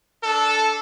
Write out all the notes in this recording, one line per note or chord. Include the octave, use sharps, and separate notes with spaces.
D4 A4